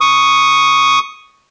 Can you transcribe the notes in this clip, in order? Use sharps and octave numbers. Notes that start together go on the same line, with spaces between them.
C#6 D#6